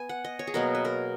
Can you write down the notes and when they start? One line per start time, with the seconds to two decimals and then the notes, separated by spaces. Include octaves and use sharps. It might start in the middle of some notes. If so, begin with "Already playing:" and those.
Already playing: B3 G#5
0.09 F#5
0.25 D#5
0.39 C#5
0.47 G#4
0.54 B2 F#3 A#3 A#4
0.75 B4
0.85 A#4